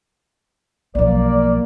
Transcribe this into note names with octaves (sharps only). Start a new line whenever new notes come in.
B1 F3 A#3 D5